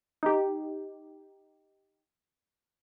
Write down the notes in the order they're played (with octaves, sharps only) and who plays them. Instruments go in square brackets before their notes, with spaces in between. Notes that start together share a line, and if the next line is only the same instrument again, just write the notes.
[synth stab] D#4 G4